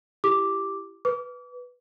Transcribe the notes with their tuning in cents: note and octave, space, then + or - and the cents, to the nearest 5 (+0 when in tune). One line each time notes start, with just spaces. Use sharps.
E4 +25 G4 +0 D6 +0
B4 +0 D6 -35